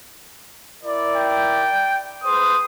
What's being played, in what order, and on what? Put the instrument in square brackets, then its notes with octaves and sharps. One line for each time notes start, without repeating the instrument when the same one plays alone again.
[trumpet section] E4 A#4 D5
[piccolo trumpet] G5
[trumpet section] G#4 B4 C5 [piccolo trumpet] D#6